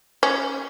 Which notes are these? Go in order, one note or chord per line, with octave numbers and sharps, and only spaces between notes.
C#4